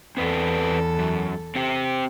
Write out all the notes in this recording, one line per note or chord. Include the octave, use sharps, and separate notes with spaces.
E2 C4 A4 B4 D5
F#2
C4 G4